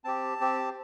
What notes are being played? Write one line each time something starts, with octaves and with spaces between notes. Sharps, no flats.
C4 G4 A5
C4 G4